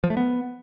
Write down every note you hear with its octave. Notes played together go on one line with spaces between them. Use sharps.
F3
A3
B3